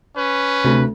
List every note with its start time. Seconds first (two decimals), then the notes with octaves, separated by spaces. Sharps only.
0.17 C#4 B4
0.64 D2 C3